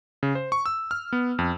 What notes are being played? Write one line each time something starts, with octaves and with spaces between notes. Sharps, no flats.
C#3
C5
C#6
E6
F6
B3
F2